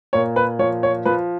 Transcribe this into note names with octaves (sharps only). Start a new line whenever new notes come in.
A#2 C#5
B4
F3 C#5
C#5
F3 B4